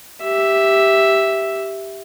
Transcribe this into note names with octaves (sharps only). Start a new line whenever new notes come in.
G4 E5